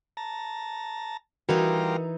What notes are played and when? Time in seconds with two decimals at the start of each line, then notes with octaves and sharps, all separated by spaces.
0.17 A5 A#5
1.49 E3 G3 D#4 F4 F#4 A#4 A#5